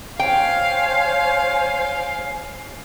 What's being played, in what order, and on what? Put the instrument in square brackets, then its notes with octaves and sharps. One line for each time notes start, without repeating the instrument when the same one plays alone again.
[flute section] C5 C#5 G#5 [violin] F5 [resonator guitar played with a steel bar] G5